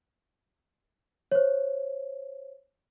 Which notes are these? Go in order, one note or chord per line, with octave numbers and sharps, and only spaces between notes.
C5 C#5